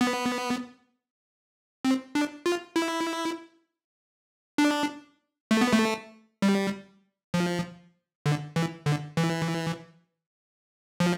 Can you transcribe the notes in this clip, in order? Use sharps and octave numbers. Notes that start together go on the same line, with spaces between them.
B3
C4
D4
F4
E4
D4
A3
B3
A3
G3
F3
D3
E3
D3
E3
F3